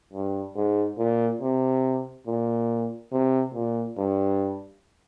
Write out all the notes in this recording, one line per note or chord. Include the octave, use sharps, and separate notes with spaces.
G2
G#2
A#2
C3
A#2
C3
A#2
G2